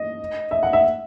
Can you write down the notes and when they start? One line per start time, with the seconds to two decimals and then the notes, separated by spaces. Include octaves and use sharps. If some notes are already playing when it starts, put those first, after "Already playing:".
Already playing: D#5
0.51 E5
0.63 F#5
0.73 E5